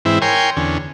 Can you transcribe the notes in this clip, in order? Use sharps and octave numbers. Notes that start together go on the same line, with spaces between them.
G#2 E3 C4 E4
A#4 C#5 G5 G#5 C6
E2 D3 C#4